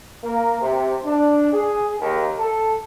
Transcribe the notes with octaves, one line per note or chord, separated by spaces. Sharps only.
A#3
C3
D4
G#4
D#2
A4